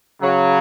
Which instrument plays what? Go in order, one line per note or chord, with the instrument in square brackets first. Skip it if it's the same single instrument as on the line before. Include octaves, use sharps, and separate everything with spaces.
[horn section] C#3 F#3